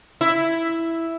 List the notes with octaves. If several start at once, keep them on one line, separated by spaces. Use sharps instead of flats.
E4